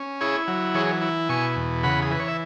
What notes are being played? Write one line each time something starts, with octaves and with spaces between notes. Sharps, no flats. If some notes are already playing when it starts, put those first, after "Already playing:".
Already playing: C#4
E4 G#4 C#5
F#3
E3 G#4 C#5
E4
B2 G#5 C#6
E2
C#3 F#5 B5
G#4
E3 B4
C#5
E5